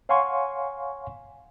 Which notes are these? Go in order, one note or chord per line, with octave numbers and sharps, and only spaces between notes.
C#5 F5 F#5 G#5 C6 C#6